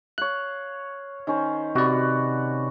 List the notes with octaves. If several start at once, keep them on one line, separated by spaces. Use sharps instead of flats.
C#5 F5 F#6
D#3 C#4 C5
C3 F#4 B4 D5